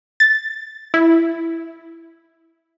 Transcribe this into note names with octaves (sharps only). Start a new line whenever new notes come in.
A6
E4